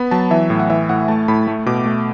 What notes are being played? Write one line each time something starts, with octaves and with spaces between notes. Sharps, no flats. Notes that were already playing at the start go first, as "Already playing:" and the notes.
Already playing: B3 B5
F#3 A5
E3 E5
A2
F#5
E3 E5
A2 F#5
A3 A5
A2 B5
A3
B2 D6
A3